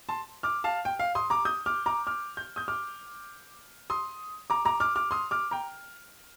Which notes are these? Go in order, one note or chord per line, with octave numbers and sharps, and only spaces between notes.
A5 C6
D6 F6
F5 A5
G5
F5
C6 D#6
A#5 D6
D#6 G6
D6 F6
A#5 D6
D6 F6
G6
D#6 G6
D6 F6
C6 D#6
A#5 D6
A#5 D6
D6 F6
D6 F6
C6 D#6
D6 F6
G5 A#5